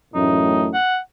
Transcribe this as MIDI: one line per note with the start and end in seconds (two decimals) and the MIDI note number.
0.14 0.73 33
0.14 0.73 42
0.14 0.73 45
0.14 0.66 63
0.74 0.98 78